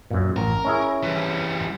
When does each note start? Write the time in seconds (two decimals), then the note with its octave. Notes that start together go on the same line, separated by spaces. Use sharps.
0.11 F#2 A#2
0.36 A1 A#4
0.65 C#4 E4 G#4
1.03 E3 G3